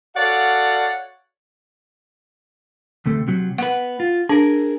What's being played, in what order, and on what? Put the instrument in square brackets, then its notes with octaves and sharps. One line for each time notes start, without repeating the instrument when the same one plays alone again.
[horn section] F#4 A4 C#5 D5 F5 F#5
[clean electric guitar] D2 C3 A3
C3 F#3
[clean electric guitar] B3 B4 [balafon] F#5
[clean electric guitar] F4
[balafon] D4 [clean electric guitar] G#4 A#4